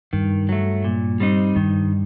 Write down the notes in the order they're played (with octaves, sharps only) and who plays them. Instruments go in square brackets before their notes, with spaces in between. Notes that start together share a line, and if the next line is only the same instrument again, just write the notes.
[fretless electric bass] G2 [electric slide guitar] D#3
[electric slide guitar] F#3 A3
A#2
G3 C4 D#4
[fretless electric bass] G2 [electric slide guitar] D#3